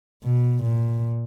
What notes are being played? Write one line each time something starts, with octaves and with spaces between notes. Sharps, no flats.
B2
A#2